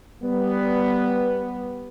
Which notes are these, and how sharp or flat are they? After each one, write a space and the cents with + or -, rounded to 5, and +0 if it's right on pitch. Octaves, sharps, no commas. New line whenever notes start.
G3 +0 B3 +0